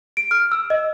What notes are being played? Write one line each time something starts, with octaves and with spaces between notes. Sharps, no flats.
D7
F6
E6
D#5